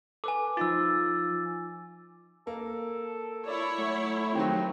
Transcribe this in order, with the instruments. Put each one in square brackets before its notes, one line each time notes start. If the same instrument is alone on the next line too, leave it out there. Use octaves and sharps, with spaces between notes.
[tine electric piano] A4 B4 [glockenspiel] G#5 D6
[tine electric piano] F3 D#4 F4 [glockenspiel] E6 A6
[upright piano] A#3 [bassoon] A4
[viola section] E4 C#5 [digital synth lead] D5
[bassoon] F#3 [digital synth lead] A3
[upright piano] D#3 F3 F#3 [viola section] C4 [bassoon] G4